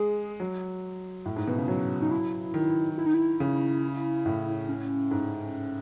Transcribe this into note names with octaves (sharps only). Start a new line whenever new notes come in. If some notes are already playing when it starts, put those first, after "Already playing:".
Already playing: G#3 G#4
F#3
A2
G#2
B2
C#3
F#3
D#4
E4
D#3
E4
D#4
E4
C#3
A2
C#4
G#2